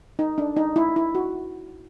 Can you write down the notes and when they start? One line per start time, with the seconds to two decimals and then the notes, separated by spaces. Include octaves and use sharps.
0.19 D#4
0.38 D4
0.56 D#4
0.76 E4
0.96 E4
1.15 F#4